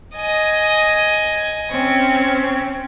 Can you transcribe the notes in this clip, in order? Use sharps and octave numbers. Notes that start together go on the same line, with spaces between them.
D#5 G#5
C4 C#4 C#6